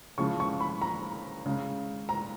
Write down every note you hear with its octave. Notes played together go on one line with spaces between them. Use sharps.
C#3 F3 G#3 C#6
C#6
B5
A#5
C#3 G#3
A#5